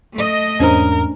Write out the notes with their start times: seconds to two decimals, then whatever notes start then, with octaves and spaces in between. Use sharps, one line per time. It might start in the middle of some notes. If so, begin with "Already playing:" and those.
0.14 A3 D#5
0.60 E2 G#2 C#4 D4 A#4 C5